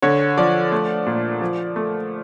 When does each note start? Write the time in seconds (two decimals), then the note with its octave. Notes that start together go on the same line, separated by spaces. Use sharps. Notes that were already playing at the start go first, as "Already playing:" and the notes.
0.02 D3 C#5
0.37 F3 D5
0.72 A3
1.06 A#2
1.41 F3
1.76 A3